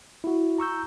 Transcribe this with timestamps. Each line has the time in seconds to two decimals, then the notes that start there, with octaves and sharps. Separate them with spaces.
0.24 E4 F#4
0.58 A#5 C#6 E6 G6